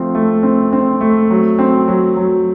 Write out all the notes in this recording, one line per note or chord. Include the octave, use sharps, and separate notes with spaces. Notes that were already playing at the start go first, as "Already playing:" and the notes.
Already playing: F3 A3 C4
A3
C4
C4
A3
F#3
C4
F#3
F#3